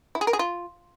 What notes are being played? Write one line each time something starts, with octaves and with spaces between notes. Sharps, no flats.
E4
G#4
A#4
G#4
F4